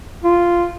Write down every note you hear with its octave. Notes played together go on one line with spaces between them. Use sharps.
F4